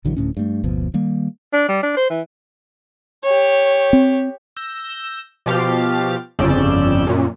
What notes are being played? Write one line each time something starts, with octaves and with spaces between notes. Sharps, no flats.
A#1 D3 E3 F#3
D1 D2 A2 C#4
G2 A3
F#1 D2 B2 F3
D#3 G3 A#3
D4
G3
D4
C5
E3
G4 C#5
C4
E6 G6 A#6
B2 F3 G4 F5 A6
G1 F2 C#3 D5 E6 G6
F#2 A#2